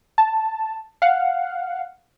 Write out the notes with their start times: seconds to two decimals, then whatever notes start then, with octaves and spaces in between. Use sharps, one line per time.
0.18 A5
1.02 F5 F#5